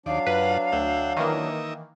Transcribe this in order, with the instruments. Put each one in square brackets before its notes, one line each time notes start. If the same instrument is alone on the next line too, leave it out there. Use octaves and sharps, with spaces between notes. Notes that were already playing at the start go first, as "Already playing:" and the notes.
[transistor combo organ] D#2 D5 [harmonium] F#3 D4 [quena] F5
[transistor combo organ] F#2 F4 F#5 [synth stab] B4
[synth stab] D2 [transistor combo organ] E5 F#5 G5
[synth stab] D#3 E3 A#3 [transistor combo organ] D#4 A#4 E5